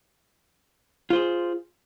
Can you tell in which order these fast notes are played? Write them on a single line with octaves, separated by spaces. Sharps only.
F4 C5 G#4